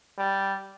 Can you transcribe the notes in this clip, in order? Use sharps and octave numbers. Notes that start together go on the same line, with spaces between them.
G3